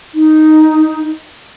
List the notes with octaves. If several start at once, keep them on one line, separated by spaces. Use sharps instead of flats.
D#4